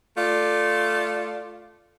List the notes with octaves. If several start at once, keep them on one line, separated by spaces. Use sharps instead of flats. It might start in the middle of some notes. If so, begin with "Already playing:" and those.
A3 F4 D5